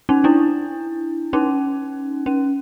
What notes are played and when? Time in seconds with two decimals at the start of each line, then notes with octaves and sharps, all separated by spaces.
0.09 C#4 D#4
0.24 D4 E4
1.33 C#4 D#4
2.26 C#4